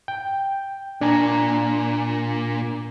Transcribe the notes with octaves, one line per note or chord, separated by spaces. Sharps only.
G5
A#2 D4 G#5 A#5